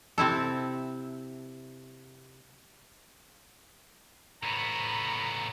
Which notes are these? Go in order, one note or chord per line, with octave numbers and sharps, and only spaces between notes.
C3 C4 E4 A4
A2 B3 A#5 B5